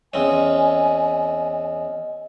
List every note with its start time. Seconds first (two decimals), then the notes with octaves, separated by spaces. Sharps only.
0.14 E2 C4 C#4 D#5 G#5